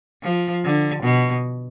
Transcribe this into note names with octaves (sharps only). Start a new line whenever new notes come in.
F3
D3
B2